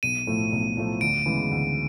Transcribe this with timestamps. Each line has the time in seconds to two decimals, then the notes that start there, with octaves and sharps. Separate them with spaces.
0.03 B1 D#7
0.27 A2 F3 A3
0.52 B1
0.77 A2 F3 A3
1.01 D2 D7
1.26 C#3 E3 G#3 B3
1.51 D2